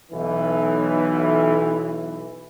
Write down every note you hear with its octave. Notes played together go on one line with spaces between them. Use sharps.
B1 E3